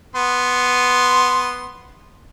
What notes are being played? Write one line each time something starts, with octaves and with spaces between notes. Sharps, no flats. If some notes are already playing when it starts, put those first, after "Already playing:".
B3 C6